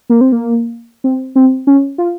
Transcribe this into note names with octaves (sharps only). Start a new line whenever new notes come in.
A#3
C4
A#3
C4
C4
C#4
F4